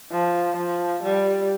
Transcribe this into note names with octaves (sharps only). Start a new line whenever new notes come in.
F3
F3
G3